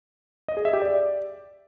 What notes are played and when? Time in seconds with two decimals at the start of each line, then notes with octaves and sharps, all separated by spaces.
0.48 D#5
0.57 G#4
0.65 E5
0.73 G4
0.82 D5